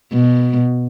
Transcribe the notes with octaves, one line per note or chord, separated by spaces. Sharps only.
B2